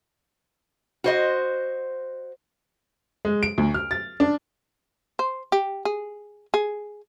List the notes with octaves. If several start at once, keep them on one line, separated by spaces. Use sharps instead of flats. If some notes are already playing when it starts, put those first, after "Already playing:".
F#4 C5 D#5
G#3
D7
D2
F6
A6
D4
C5
G4
G#4
G#4